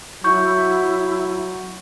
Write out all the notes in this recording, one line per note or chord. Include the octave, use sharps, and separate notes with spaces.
F#3 E4 C#6 G6